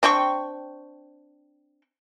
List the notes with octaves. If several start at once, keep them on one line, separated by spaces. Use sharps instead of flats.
C4 D4 G5 C#6